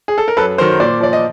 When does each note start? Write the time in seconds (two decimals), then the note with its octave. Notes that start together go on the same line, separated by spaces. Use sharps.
0.08 G#4
0.18 A4
0.28 A#4
0.37 F#2 A4 B4
0.58 D#3 F#3 A#4 C5
0.80 A#2 C5 D5
1.00 F3 D5
1.13 D#5